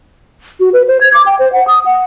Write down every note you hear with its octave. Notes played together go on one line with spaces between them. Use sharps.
F#4
B4
C5
G#6
D6
G5
C5
F#5
D#6
F#5